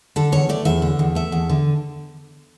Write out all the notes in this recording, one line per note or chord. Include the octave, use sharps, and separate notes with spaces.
D3 A4
E2 C#5
A3 D5
E2 E5
D3
E2
A3 E5
E2
D3